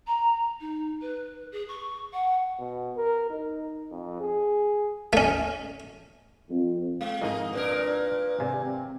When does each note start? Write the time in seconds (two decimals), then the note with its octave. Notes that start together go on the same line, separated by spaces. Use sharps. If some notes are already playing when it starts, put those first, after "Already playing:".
0.07 A#5
0.60 D#4
1.01 B4
1.51 G#4
1.68 C#6
2.13 F#5
2.59 B2
2.97 A#4
3.30 D#4
3.91 F2
4.20 G#4
5.13 A3 C#4
6.50 F2
7.01 G#3 F5
7.21 F2 G#2 D#3 D#4 D#5
7.53 A#2 D4 A#4 B4
8.39 G#1 C3 G#5
8.63 C4